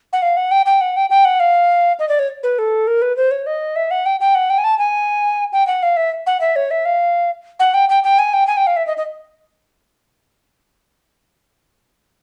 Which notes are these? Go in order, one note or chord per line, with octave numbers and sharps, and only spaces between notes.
F#5
F5
F#5
G5
G5
F#5
G5
G5
F#5
F5
D#5
D5
C#5
B4
A4
A#4
B4
C5
C#5
D#5
E5
F#5
G5
G5
F#5
G5
G#5
A5
G#5
G5
F#5
F5
E5
F#5
E5
C#5
E5
F5
F#5
G5
G5
G5
G#5
G5
G#5
G5
F5
E5
D#5
D#5